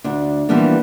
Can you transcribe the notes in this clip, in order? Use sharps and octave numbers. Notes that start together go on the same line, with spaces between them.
D2 D4
E3 F3 G3 A#3 B3 D4